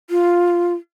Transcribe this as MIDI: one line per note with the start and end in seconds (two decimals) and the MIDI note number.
0.10 0.74 65